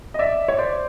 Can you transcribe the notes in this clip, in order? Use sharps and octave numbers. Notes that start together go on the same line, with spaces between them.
D#5
D5 E5
C#5
C5 D5